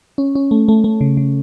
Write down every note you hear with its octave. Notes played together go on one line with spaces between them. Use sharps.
C#4
C#4
A3
A3
A3
C#3
C#3